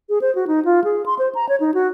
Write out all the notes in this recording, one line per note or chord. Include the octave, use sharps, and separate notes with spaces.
G#4
C5
F#4
D#4
F4
G#4
C6
C5
A#5
C#5
D#4
F#4